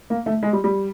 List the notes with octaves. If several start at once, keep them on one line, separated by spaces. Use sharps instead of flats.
A#3
A3
G#3
G3
G3